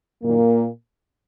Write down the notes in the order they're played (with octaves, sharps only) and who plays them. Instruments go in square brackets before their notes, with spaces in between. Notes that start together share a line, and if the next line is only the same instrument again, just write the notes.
[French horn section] F#2 A#2 D#3 A#3